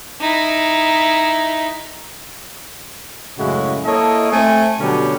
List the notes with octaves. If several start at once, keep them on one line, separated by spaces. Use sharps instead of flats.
D#4 E4
F#2 A2 C#3 G#3 E4 F#4
A#3 E4 A4 C#5 D#5
A3 C4 G#5
B2 D3 F#3 G3 C#4 G4